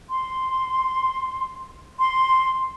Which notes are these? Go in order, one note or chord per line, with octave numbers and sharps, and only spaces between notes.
C6
C6